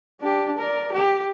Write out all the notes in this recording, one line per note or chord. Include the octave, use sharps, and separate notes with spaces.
D4 G4
A#4 D5
G4